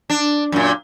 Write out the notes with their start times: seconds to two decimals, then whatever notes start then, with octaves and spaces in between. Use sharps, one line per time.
0.10 D4
0.52 F#2 A#2